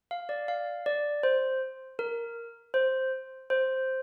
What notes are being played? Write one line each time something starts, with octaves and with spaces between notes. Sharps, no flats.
F5
D5
F5
D5
C5
A#4
C5
C5